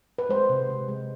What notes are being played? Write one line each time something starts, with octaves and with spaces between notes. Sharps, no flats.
B4
G#3 C5
C3
C3
G#3